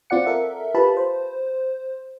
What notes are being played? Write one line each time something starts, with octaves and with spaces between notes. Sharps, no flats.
C4 F4 D5 F#5 C#7
A4 A#4 E5
F4 G4 B4 A5 B5
C5